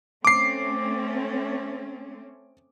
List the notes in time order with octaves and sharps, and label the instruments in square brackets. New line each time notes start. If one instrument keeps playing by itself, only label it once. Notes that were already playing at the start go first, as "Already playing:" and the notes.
[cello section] A3 C4 C#4 [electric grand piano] D6 C7